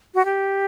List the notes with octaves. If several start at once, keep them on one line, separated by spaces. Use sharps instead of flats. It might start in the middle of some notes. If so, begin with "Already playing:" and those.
F#4
G4